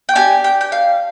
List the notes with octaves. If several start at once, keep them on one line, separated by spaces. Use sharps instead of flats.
G5
D4 G4 G#5
G5
G5
F5